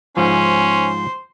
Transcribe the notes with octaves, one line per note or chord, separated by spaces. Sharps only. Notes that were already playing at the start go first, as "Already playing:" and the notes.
G#2 F3 C#4 C5